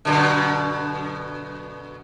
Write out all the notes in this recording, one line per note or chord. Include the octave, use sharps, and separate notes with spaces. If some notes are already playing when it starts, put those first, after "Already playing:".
F#2 B2 D3